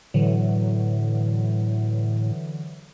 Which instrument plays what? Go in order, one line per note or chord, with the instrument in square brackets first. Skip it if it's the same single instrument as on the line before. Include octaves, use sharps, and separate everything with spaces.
[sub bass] A2 [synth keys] D3 E3 F#3